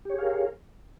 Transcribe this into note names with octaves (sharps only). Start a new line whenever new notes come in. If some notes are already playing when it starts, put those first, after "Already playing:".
G4 G#4 A#4 C#5 F5